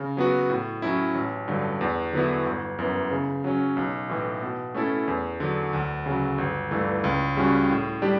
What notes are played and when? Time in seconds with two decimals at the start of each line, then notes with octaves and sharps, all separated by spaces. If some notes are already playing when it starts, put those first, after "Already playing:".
Already playing: C#3
0.17 F#3 B3 F#4
0.50 A2
0.82 F#3 C#4 E4
1.15 A1
1.48 G2 D3 F#3
1.81 E2
2.13 D3 F#3 B3 E4
2.46 G1
2.79 F#2 E3 B3
3.11 C#3
3.44 F#3 C#4
3.77 B1
4.09 A2 E3
4.42 B2
4.74 A3 C#4 E4 A4
5.08 E2
5.40 D3 F#3
5.73 D2
6.06 C#3 F#3
6.38 G1
6.71 G2 E3 A3
7.04 C#2
7.36 C#3 G3 C#4 F#4
7.69 A2
8.02 G3 D4 G4